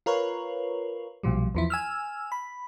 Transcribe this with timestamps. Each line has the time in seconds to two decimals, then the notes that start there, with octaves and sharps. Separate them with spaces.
0.06 F4 A#4 B4 C#5
1.23 B1 A#2 F3 G3
1.55 E2 F3 E4
1.70 G#5 E6 F6
2.32 B5